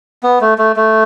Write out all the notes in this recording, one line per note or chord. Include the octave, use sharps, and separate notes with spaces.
B3
A3
A3
A3